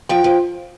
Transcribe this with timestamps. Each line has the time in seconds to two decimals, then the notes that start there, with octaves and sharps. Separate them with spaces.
0.09 F3 G5
0.24 F3